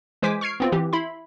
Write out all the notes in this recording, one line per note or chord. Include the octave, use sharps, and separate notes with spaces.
E3 G#3 C5 G#5 D6 B6
C#6 F6 G#6 C7 D7
B3 C4 F4
E3 G4
E4 B5 C6